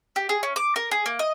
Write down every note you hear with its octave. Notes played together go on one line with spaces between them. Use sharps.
G4
G#4
C#4
D6
A#4
G#4
A#3
D#5